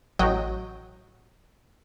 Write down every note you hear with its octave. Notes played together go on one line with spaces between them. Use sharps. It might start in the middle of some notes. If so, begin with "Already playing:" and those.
A1 F#3 F#4 D#5 G5